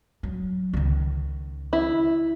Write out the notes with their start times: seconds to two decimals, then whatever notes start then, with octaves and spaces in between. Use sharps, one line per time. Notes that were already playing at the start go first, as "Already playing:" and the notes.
0.23 F#3
0.73 C#2 D#3
1.73 E4